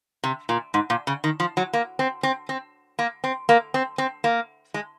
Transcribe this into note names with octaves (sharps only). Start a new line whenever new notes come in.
C3
A#2
G#2
A#2
C#3
D#3
F3
F#3
A#3
C4
C4
C4
A#3
C4
A#3
C4
C4
A#3
G#3